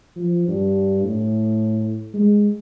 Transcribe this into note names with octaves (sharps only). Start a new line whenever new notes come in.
F3
G2
A2
G#3